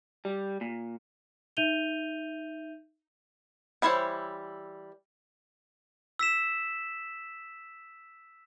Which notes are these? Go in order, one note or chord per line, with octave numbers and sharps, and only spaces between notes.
G3
A#2
D#4 E5 G6 D#7 F7 G7
E3 G3 E4 C5 C#5
E6 B6 E7